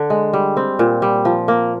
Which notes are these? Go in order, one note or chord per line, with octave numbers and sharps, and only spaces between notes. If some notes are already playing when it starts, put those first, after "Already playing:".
Already playing: D3
G#3
G3
C4
A#2
G3
F3
A#3